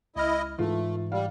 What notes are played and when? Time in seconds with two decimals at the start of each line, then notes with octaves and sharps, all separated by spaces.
0.16 C#2 E4 D#5 F6
0.59 G#2 E3 A3 F4
1.12 G3 F5